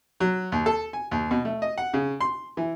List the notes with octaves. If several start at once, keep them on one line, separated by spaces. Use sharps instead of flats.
F#3
D#2
A4
G#5
D#2
B2
A3
D#5
F#5
C#3
C6
E3